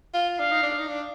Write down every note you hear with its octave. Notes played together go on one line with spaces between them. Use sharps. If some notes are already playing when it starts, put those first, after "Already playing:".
F4
D4 F5
D#4
D4
D#4
D4